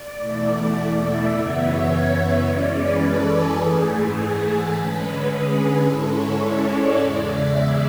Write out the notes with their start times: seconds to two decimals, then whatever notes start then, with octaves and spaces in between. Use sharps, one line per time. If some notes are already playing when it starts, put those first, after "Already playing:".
Already playing: D5
0.15 E2 B2 A3 E4
1.01 E5
1.29 F#2 C#3 E3 B3 E5
1.57 C#5
2.42 F#2 E3 G#3 C#4 D5
2.71 B4
2.99 A4
3.28 G#4
3.55 G#2 E3 A3
3.84 G#4
4.40 A4
4.68 D3 G#3 C#4 B4
5.25 G#4
5.81 G#2 G#3 C#4 E4 A4
6.09 C#5
6.38 D5
6.95 E2 C#3 G#3
7.24 E5